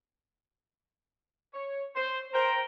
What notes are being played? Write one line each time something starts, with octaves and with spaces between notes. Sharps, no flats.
C#5
C5
A#4 C5 G5 A#5